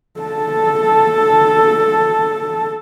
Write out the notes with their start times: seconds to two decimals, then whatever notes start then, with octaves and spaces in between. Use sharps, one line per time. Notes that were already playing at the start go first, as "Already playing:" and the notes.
0.21 A4 A5